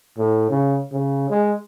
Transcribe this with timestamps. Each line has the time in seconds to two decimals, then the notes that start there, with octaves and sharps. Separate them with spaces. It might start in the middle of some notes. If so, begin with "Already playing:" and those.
0.17 A2
0.50 C#3
0.92 C#3
1.30 G#3